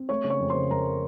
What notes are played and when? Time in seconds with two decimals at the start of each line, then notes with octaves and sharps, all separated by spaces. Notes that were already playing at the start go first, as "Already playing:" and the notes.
Already playing: C4
0.09 A3 C#5 C#6
0.24 C#3
0.30 C#5 C#6
0.40 F2
0.50 C#3 C5 C6
0.71 F2 A#4 A#5